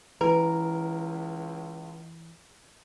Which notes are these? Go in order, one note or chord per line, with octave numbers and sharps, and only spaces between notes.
C#2 E3 A#4 B4